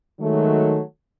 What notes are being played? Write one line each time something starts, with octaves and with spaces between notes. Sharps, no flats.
D#3 F#3 G#3 A3